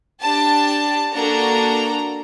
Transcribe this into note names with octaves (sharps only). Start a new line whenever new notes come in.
D4 G4 A5
A#3 D4 F#4 A4 A#5